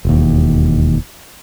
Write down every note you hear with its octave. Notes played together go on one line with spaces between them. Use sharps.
E1 D#2